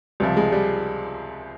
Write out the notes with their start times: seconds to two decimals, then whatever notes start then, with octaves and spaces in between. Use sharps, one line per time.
0.20 C#2 C3 F3 G3
0.37 G#3
0.52 G3